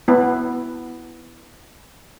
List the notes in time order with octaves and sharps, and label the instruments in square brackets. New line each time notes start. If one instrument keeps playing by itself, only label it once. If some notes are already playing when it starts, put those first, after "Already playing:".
[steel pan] B3 E4